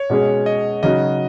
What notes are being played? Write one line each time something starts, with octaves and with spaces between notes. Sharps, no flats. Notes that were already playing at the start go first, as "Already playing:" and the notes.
Already playing: C#5
B2 G#3 C#4 G#4
D#5
C#3 F#3 D#4 F#4 D#5